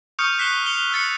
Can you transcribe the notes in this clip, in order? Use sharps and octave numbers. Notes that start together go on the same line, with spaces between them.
C#6 D#6 F6 G6 C#7
F#6 B6 C7 E7 G7
C#7 F7 G7
E6 F#6 A6 C#7